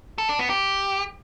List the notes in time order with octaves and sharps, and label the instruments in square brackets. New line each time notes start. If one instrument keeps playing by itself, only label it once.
[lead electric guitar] A4
D4
B3
G4